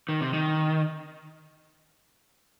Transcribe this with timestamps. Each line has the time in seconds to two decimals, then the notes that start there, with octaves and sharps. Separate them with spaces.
0.09 D#3
0.21 C3
0.33 D#3